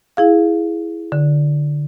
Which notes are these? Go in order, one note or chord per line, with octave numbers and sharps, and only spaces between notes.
E4 G#4 F5
D3